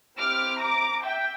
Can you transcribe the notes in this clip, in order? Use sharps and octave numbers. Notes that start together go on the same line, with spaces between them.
C4 E4 G4 D6 F6
A#5 D6
E5 G5